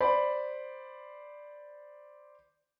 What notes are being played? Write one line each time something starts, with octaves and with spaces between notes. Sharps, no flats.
C5 D5 B5